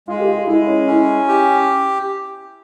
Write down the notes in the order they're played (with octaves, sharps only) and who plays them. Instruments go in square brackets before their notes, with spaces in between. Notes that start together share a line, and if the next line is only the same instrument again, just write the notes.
[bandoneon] G#3 [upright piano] F4
[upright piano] G4
F4
[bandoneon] G#3 [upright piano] E4
[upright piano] C#4
[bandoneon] C#4 [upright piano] E4
[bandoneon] G4